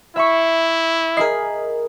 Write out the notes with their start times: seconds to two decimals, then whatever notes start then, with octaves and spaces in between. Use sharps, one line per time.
0.16 E4 E5 B5 C#6
1.17 G#4 A#4 D#5 B5 C7